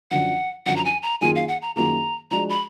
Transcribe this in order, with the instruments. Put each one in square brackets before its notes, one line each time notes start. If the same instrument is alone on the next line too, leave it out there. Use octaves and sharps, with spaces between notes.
[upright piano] F#2 D3 F3 [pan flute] F#5
[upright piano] F#2 D3 F3 [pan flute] F#5
[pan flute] A#5
G#5
A#5
[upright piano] F#2 D#3 A#3 F4 G#4 [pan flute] G#5
[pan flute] F5
F#5
A#5
[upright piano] F#2 D#3 A#3 F4 G#4 [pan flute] A#5
[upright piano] F3 G#3 D4 F#4 [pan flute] A#5
[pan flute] B5